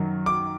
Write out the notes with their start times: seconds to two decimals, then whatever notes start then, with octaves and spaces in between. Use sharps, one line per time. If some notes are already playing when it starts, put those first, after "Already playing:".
Already playing: F#2 D#3 F#3
0.26 D6